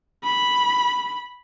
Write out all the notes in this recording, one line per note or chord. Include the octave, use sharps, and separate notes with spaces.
B5